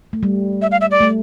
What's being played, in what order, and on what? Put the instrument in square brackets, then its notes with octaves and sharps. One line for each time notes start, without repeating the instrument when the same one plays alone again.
[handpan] A3
G3
[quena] E5
F5
E5
D5
[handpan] A3